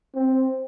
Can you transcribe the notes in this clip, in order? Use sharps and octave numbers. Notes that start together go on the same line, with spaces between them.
C4